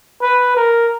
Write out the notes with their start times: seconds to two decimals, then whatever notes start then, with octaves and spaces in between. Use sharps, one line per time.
0.22 B4
0.57 A#4